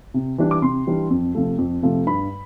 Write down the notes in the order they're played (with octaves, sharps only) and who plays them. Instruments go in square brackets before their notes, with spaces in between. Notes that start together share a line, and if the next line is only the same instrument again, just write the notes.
[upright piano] C3
E3 G3 D4
D6
C3 C6
E3 G3 D4
F2
C3 F3 A3
F2
C3 F3 A3
G2 B5